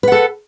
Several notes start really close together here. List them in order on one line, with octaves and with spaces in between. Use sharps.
B4 F#5 A4